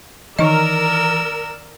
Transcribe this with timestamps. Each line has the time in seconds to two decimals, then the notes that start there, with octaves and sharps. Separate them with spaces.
0.39 D#3 E3 D#4 A#4 D5 D#5 E6